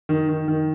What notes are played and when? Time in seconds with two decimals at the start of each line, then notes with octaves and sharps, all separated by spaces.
0.09 D#3
0.28 D#3
0.48 D#3